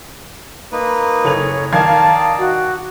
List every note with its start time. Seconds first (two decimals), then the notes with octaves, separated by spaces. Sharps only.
0.72 A#3 D#4 B4
1.24 F#1 A4 C#5 F7
1.73 D#3 D#4 D5 F5 A5 G#6
2.38 F#4